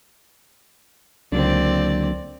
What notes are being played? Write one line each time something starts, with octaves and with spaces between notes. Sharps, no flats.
C#2 D3 F#3 A#3 C4 D5